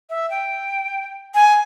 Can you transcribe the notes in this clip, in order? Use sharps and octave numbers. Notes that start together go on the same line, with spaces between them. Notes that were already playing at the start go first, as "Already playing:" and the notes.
E5
G5
G#5